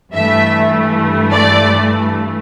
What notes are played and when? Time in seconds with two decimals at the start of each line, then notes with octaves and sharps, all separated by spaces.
0.13 G2 E3 A3 E5
1.31 D5